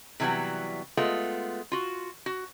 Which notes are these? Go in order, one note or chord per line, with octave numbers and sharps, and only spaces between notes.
C3 E3 F#3 G3 B3
G#3 A3 B3 F4
F4 F#4
F#4